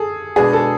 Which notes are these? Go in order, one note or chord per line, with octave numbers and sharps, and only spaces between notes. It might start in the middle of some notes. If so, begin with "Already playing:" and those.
Already playing: G#4 A4
B2 G#3 B3 D4 G#4
A4